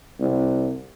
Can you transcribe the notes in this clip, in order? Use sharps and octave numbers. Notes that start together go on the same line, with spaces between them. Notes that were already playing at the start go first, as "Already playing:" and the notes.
C2